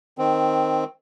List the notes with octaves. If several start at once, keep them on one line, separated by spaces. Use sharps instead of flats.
D#3 C4